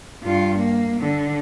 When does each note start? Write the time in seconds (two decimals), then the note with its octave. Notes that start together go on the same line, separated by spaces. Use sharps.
0.23 G2 F4
0.58 A#3
1.01 D3